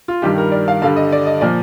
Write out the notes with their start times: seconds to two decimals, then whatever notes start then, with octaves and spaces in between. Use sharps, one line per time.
0.08 F4
0.22 G2 D#3 G3 G4
0.38 A#4
0.52 D5
0.68 F5
0.82 G2 D3 G3 F5
0.96 D#5
1.12 D5
1.26 D#5
1.41 A#2 F3 D5